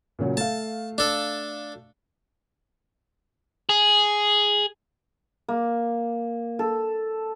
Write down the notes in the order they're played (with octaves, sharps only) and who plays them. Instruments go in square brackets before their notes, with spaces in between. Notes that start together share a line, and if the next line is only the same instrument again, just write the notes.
[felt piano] A#2 C#3 F#3
[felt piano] A3 F5 [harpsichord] A5
[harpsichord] D4 A4
[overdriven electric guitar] G#4
[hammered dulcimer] A#3
A4